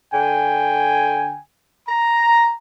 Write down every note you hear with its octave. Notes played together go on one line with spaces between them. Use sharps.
D3 G5 G#5
A#5